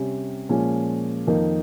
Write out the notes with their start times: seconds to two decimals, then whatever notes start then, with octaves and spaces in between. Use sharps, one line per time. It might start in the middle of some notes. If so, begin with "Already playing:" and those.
Already playing: C3 G3 C#4
0.49 A#2 F3 G#3 C#4
1.27 F2 D#3 A#3 D#4